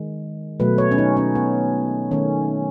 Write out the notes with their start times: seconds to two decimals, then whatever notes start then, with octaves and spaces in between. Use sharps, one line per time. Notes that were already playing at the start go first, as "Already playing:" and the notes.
Already playing: D#3 G#3
0.60 B2 F#3 A3 B4
0.78 C#5
0.91 C#4
0.98 D#4
1.17 C#4
1.35 B3
2.11 D#3 A3 C#4